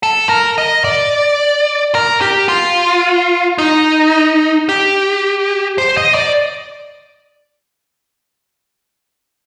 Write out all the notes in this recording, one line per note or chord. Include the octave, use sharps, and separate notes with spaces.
A4
A#4
D#5
D5
A#4
G4
F4
D#4
G4
C5
D#5
D5